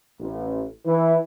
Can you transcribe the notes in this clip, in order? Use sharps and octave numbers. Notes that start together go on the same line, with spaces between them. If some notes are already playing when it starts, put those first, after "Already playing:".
A1
E3